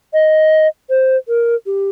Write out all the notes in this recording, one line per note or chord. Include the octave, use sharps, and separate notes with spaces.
D#5
C5
A#4
G4